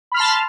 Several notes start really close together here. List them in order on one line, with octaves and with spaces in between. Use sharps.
B5 F6 C6 A5